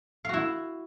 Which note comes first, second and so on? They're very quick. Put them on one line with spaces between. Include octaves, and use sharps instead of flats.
F5 F#4 E4